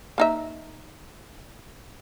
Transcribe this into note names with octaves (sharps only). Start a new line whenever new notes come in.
A#3 D#4 E5